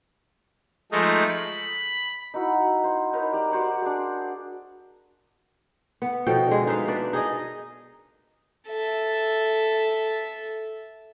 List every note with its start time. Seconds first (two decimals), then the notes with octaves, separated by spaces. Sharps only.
0.92 F3 G#3 A3 D#4
1.29 B5
2.34 D#4 E4 F#4 F#5
2.84 C5
3.13 D#4 A#4 B4 C#5
3.33 G4 D5
3.51 F#4 C5 D5 C#6
3.82 D4 G#4
6.02 B3
6.26 B2 F3 A4 G5
6.47 D3 G#3
6.67 D#4 B4 E5 F5
6.88 D4 B4 D5
7.13 D#4 G#4 A#4 D#5
8.68 A4 E5